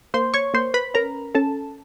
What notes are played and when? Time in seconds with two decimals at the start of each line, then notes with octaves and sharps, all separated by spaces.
0.14 A#3 C5 C6
0.34 C#5 C#6
0.54 A#3 C5 C6
0.74 B4 B5
0.94 C#4 A#4 A#5
1.35 C#4 A4 A5